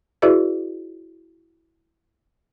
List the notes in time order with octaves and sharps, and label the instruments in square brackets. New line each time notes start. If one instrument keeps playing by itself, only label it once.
[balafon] E4 F#4 G#4 B4 D5 E5